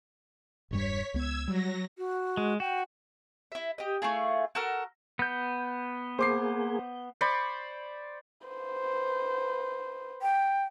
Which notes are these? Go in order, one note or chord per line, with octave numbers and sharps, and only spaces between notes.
E1 G2 G3 C#5 B6
C#2 B3 E6 G#6
F#3 G3 A#6
F#4
G#3
F#4 G5
E4 E5
G4 D#5
A3 E4 F4 G#4
F#4 A4 A#4 F6
B3 G6
A#3 G#4 C5 D6 C7
C5 D5 B5 C#6
B4 C5
G5